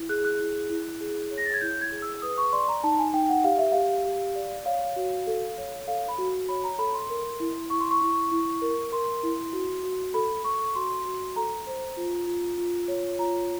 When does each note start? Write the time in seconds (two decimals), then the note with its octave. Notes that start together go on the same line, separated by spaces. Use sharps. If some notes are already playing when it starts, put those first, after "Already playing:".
Already playing: E4
0.09 G#4 F#6
0.25 F#6
0.40 E4
0.70 E4
1.01 G#4
1.31 C#5
1.38 A#6
1.46 A6
1.54 G#6
1.61 E4 G6
1.81 G#6
1.92 G#4
2.02 E6
2.22 B4 D#6
2.38 C#6
2.53 D5 C6
2.68 A#5
2.84 D#4 A5
2.99 G#5
3.13 D#4 G5
3.29 F#5
3.44 G4 F5
3.58 E5
3.72 G4 F5
4.05 G4
4.35 D5
4.66 C#5 F5
4.96 F#4
5.27 A4
5.58 C#5
5.88 A4 F5
6.09 B5
6.18 F#4
6.49 C#5 B5
6.64 A#5
6.79 A4 B5
6.94 C6
7.10 A#4
7.40 E4
7.70 E4 C#6
7.80 C6
7.91 C#6
8.02 E4
8.32 E4
8.62 A#4
8.92 A#4 C6
9.23 E4
9.53 F#4
9.83 F#4
10.14 A4 B5
10.44 A4 C#6
10.75 F#4 C6
11.05 F#4
11.36 A4 A#5
11.67 C5
11.97 F4
12.27 F4
12.58 F4
12.88 C#5
13.19 F4 A#5